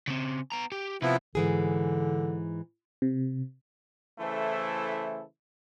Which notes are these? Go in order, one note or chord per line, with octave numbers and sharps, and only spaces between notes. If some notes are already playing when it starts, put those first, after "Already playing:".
C#3 C4
B3 A#5
G4
C3 F3 B3 E4
G#2 D3 E3 G#4
C3
C#3 E3 A3 E4 A4 C5